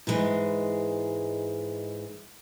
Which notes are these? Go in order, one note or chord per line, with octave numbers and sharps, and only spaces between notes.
G#2 E3 G#3